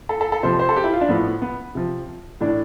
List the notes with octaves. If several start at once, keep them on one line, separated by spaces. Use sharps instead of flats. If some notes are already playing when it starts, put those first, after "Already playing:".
A4
A4
A4
C3 F3 C5
C5
A4
G4
E4
F4
D4
A2 F3 B3
B3
C3 F3
A2 E3 D4